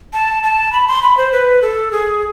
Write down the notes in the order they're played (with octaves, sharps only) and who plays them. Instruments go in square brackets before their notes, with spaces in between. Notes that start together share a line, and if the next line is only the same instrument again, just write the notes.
[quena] A5
A5
B5
C6
B5
C5
B4
A4
G#4